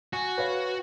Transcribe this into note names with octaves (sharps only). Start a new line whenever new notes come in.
F#4 G#5
B4 C#5 F5